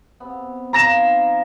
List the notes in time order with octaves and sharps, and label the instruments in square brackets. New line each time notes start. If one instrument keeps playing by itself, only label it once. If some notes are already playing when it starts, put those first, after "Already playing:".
[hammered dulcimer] C3 B3
[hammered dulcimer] F3 D#4 F4 [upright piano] A#5 A#6 E7